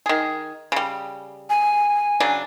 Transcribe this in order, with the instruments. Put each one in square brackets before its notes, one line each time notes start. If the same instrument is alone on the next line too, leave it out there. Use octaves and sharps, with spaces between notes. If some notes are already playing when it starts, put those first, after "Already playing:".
[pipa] D#3 G#4
C#3 G3
[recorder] G#5
[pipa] C#3 F#3 D4